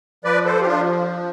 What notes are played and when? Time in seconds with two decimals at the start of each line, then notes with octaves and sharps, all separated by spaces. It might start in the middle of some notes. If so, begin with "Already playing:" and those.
0.25 F3 B4 D5
0.45 A4 C5
0.56 F3 G4
0.66 D4 F4